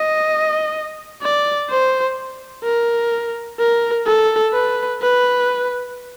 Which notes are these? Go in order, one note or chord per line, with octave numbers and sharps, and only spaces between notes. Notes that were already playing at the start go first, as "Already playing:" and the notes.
Already playing: D#5
D5
C5
A#4
A#4
A4
B4
B4